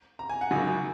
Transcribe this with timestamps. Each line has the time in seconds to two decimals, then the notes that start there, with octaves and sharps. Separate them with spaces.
0.19 A#5
0.29 G#5
0.41 F#5
0.51 G#1 F#2 C#3 F#3 G#5